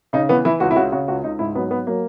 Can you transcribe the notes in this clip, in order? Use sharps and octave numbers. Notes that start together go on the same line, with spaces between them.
C#3 D#4
E3 B3
E3 E4
C#2 F#4
E4
C#3 F#4
C#3 F#4
C#2 F#4
C#2 D#4
G#2 E4
F#3 B3
F#3 B3
F#3 A#3